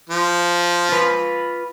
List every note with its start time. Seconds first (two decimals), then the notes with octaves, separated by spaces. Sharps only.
0.10 F3
0.89 F4 B4